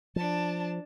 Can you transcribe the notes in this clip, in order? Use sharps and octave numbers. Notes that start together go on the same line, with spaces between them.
F3 D4 A5